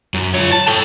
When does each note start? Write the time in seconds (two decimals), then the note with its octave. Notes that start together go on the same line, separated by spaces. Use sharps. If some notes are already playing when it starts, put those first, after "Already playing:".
0.14 F#2
0.34 F4 C#5
0.52 A5
0.68 A4 G5